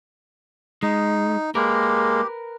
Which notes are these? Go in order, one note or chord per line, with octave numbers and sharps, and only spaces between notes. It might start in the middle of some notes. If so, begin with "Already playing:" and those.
G#3 D#4
G#3 A#3 G4 A#4 B4